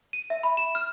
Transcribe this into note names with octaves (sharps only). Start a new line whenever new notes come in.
D#7
E5
B5
E7
F6